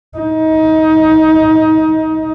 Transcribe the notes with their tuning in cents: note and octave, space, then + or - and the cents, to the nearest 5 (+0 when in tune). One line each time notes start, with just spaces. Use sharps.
D#4 +25